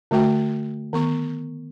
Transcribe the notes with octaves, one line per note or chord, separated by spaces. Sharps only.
D3 A3 F#4 G5
D#3 B3 C#6